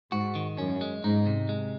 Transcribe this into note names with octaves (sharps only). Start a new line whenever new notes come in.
G#2 F#4
D#3
F#2 C#4
G#3
G#2 D#4
C3
G#3